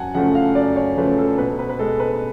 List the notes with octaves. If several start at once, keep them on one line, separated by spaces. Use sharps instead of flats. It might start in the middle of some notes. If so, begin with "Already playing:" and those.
Already playing: F#2 F#5 G#5 A5
C#3 F3 A3 F#5
F5
F#2 D5
C#5
C#3 F3 A3 B4
A4
B2 B4
B4
B4
G#3 A4
B4